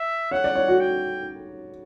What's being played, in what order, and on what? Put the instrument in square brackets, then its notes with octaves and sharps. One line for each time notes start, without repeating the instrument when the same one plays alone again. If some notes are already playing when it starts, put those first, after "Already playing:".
Already playing: [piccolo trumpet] E5
[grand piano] C#5 [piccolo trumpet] F#5
[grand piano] D5
C#5
F#4
[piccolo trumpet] G5